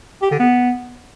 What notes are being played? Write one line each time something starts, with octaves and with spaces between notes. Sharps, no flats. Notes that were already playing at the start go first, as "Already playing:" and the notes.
G4
D3
B3